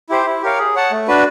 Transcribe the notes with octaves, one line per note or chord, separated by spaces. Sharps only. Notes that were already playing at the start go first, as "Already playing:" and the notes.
E4 G4 C5
E4
G4 A#4 C#5 F5
G#4
C#5 F#5 A5
A3
D4 F#4 B4